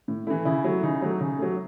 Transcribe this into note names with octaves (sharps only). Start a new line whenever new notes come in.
A2
E3 A3 E4
C#3 E4
F#3 A3
C#3 D#4
F#3 A3
C#3
F#3 A3